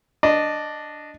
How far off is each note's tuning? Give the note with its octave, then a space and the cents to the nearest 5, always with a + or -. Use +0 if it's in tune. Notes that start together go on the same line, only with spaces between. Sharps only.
D4 +0 D#5 -15